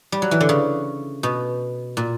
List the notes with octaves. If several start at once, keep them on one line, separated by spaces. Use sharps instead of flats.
G3
F#3
E3
D3
C#3
B2
A#2